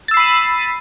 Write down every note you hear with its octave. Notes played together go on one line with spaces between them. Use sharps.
B5 E6 A6 C7 D#7